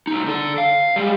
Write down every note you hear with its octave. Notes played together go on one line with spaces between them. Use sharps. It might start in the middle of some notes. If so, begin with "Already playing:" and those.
C2 D#4
D3 A4
F5
G3 G#3